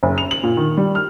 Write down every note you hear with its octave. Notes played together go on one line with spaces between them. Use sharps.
F#1
F7
F#7
A#2
D#3
G3
F6